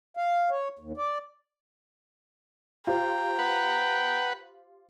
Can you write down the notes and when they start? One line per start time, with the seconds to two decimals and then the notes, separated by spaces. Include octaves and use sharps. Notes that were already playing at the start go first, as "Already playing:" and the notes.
0.17 F5
0.50 C#5
0.79 D#2
0.97 D5
2.87 F4 G4 C5 G5 A#5
3.39 B4 F#5